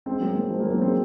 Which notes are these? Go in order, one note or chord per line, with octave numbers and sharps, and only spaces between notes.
G#3 C4
F#3 A#3
F#3 A#3
F3 G#3
F#3 A#3
F#3 A#3
G#3 C4